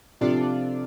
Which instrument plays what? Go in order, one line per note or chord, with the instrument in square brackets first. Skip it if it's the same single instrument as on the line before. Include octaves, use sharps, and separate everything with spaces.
[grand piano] C3 [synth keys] F3 D4 F4 A4 D5